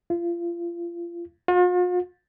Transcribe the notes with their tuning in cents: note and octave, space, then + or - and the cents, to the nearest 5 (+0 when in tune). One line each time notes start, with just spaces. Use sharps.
F4 -30
F4 +45